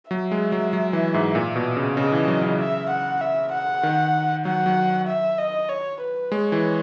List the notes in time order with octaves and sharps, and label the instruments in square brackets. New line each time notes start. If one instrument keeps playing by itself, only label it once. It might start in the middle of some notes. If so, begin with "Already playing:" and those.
[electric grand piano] F#3 [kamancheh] E5
[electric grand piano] G#3
F#3
F#3
E3
G#2
A#2
B2
C#3
[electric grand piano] C#3 [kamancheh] D#5
[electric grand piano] E3
F#3
C#3
[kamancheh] E5
F#5
E5
F#5
[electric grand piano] D#3
[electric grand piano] F#3 [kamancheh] F#5
[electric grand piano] F#3
[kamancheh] E5
D#5
C#5
B4
[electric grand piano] G#3 [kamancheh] C#5
[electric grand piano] E3